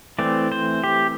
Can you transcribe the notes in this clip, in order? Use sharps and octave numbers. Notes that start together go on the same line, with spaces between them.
E3 A3 C4 D5
C5
G4